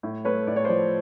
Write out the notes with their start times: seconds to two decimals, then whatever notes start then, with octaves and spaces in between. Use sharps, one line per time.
0.03 A2
0.25 A3 B4 C#5
0.47 A2 D5
0.56 C#5
0.64 F3 C5 D5